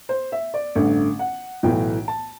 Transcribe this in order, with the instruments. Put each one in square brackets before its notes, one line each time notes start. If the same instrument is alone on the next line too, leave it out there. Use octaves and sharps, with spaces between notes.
[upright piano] C5
E5
D5
A1 G2 D3 A3
F#5
B1 A2 E3 A3 G5
A5